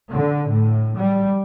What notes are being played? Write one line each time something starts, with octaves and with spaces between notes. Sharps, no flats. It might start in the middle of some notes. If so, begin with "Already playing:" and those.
D3
A2
G3